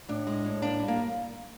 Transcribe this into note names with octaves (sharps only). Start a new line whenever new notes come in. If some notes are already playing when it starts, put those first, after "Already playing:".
A2 D4
G#3
A2
A#3 D4
G3
A#3